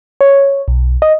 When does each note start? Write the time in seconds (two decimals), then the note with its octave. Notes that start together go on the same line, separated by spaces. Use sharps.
0.21 C#5
0.68 B1
1.02 D#5